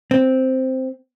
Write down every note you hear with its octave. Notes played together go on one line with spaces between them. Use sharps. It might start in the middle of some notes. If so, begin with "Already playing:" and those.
C4